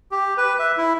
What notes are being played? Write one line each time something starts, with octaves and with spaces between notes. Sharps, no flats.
G4
B4
E5
E4